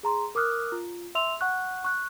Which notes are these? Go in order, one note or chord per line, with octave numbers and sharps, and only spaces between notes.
G#4 A#5 C6
A#4 D6 D#6 F6 F#6
F4
E5 C6 E6 F7
F#5 C#6 F#6
C#6 F#6